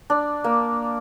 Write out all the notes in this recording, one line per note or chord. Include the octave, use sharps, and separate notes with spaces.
D4
A#3